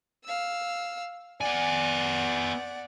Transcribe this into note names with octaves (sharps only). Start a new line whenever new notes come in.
F5 E6
B3 D5 F#5 G#5